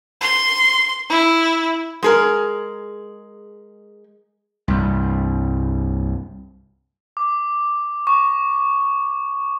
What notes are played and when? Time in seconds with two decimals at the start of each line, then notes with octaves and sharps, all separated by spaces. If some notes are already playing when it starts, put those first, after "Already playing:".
0.21 C6
1.09 E4
2.03 G#3 G#4 A#4
4.68 C2 G2
7.17 D6
8.07 C#6